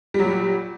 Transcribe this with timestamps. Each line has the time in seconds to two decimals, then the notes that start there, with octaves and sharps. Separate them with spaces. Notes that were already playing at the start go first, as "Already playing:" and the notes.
0.14 G3
0.19 F#3
0.24 A#2